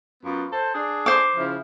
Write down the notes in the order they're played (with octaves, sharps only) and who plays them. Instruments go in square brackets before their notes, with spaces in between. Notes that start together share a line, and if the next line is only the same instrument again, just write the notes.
[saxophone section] F#2 B3 F4
A4 C5
D4 G#4 D5
[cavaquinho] C5 D6
[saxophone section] C#3 F3 E4